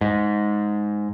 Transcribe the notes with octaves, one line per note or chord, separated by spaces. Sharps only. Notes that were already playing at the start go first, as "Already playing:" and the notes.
G#2